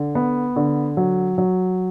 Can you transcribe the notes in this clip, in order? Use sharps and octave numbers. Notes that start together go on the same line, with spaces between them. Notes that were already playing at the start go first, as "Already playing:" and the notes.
Already playing: D3
B3
D3
F#3
F#3